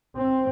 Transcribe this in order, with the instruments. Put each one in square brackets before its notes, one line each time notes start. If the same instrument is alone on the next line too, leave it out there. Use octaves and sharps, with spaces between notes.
[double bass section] C4